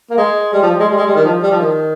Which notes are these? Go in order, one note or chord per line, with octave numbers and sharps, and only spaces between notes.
A#3
G#3
G3
F3
G3
G#3
G3
G#3
G3
D#3
F3
G3
F3
D#3